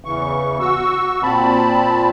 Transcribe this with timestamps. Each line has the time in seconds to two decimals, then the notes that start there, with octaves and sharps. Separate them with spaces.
0.05 E2 C#3 E3 C#6
0.60 F#4 C#6 E6
1.23 A#2 C4 A5 B5